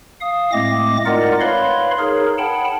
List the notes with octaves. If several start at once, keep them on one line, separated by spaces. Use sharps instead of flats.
F5 D#6
A2 G#3 A3 C4 D6 A#6
D#4 F4 A#4 D5 D#5 F#5
B4 C#5 F5 B5 C6
D#4 G#4 A#4 C#5
F#5 G5 A5 B5